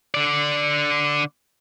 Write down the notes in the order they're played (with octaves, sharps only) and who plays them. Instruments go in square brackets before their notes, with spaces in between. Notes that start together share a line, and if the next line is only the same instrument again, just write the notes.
[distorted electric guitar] D3 D5